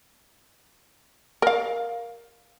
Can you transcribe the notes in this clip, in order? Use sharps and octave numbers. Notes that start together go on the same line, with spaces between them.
A#4 F5